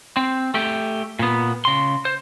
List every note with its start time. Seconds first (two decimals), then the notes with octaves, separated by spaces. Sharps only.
0.17 C4
0.54 A3 G4
1.19 A#2 B3
1.65 C#3 C6
2.05 C5